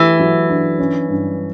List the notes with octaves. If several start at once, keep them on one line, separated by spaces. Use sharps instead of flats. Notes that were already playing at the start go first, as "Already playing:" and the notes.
Already playing: E3 A3 G4
F#3
D4
C#4
G2